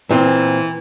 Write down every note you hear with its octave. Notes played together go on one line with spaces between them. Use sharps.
A#2 E3 C4